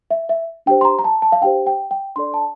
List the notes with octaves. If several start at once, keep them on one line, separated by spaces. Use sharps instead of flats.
E5
E5
D4 G4 C5 G5
C6
A#5
A#5
A5
A5
F5
D4 G4 C5 G5
G5
G5
D4 A4 D5 C6
A5